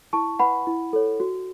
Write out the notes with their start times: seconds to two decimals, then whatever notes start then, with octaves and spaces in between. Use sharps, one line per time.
0.13 E4 A5 C#6
0.39 B4 F#5 B5
0.67 E4
0.93 A4 C#5
1.20 F#4